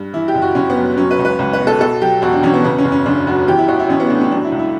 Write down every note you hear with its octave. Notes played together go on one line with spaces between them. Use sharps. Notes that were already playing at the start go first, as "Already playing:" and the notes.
Already playing: G2
E3 E4
G4
F#1
F#4
F#1 C#4
B3
F#2
F#3 C#4
B4
C#2
B4
C#2
B4
B2
A4
B2 A4
F#3 G4
E1 F#4
D4
E2 C#4
B3
C#3 B3
C#4
F#1
C#4
F#1 D4
F#2 F#4
E3 G4
E4
A1 F#4
E4
A1 C#4
B3
A2 D4
C#4
F#3 D4
E4
C#2
E4